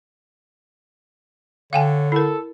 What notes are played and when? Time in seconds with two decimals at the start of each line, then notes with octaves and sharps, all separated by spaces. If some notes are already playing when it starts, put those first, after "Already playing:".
1.73 D3 C#5 F5 G5 G#5
2.12 E4 A4 A#4